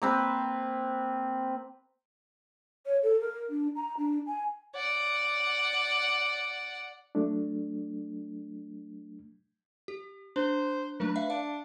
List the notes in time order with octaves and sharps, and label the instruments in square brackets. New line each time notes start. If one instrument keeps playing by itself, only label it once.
[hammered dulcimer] A#3 C4 B4
[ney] C#5
A4
A#4
D4
A#5
D4
G#5
[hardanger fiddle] D5 F#5
[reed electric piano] F#3 A3 D4
[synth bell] G4
[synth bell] D4 [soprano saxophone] C5
[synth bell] F#3 A3 D4 [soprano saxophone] B4
[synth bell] E5 F5
[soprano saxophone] D4 [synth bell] F5